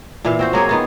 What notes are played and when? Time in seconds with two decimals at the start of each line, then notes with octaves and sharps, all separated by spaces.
0.25 A#2 E3 F5
0.39 C4 F#4 C5
0.53 F#3 A#3 G#4 C#5
0.69 D#3 B3 F4